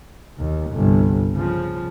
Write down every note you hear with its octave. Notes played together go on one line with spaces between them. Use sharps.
D#2
G1 C2
C#3 F3